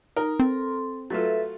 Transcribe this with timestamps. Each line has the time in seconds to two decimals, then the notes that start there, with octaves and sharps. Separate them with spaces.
0.17 D#4 A#4
0.40 C4 A4 C6
1.10 F#3 A3 F4 A4 B4 E5